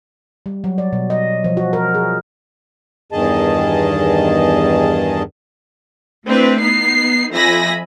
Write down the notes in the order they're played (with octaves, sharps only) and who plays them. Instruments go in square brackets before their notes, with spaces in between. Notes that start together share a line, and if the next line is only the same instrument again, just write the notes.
[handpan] G3
F#3
D5
B2
D#5
F3
F#4
A#4
G#4
[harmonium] E2 G2 D#3 G#4 D#5 A5
[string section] A3 C4 D4 E4 B4
B3 D#4 C7
F2 F3 E5 G#5 B5 A#6